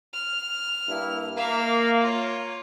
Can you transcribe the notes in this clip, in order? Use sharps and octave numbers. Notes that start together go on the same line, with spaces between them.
F6
G2 A#3 E4
A#3 E5 F5
F4 C#5